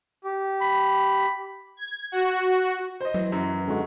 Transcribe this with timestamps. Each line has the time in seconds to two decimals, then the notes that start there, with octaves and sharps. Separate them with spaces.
0.24 G4
0.61 B5
1.77 G#6
2.12 F#4
3.01 C5 D#5
3.14 E3 F#3
3.32 F#2
3.67 D3 G#3 F#4